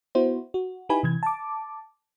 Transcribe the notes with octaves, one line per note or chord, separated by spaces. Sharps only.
B3 E4 F#4 C5
F#4
D#4 E4 G4 B4 G#5 B5
C3 E3 G#6
A5 D6